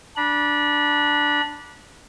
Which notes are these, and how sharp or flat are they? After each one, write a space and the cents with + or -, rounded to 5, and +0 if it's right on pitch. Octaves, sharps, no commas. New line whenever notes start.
D4 +0 B5 -35